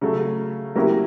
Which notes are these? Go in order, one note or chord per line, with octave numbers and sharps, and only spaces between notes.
C#3 F#3 A3
F#3 A#3 C#4 E4 G4